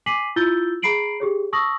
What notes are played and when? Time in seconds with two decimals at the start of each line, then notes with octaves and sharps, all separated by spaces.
0.06 G#5 D6 B6 C7 D#7 F#7
0.36 E4 F4 E6 G6 A6 G7
0.82 G#4 A#5 B5 C7 D7 F#7
1.20 G4 G#4 C#5
1.53 A5 C#6 D#6 E6 A#6 F#7